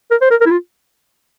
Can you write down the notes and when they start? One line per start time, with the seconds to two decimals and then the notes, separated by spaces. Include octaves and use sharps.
0.11 A#4
0.21 C5
0.31 A#4
0.41 A#4
0.46 E4
0.51 F4